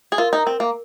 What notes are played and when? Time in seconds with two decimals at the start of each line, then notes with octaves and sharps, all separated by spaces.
0.12 G#4
0.18 F4 A#4
0.33 D#4
0.46 C4 A#4
0.60 A#3